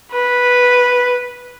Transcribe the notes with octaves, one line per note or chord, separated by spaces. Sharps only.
B4